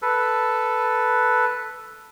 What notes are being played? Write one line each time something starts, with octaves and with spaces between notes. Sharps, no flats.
A4 B4